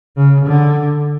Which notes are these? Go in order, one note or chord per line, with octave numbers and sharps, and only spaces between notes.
C#3
D3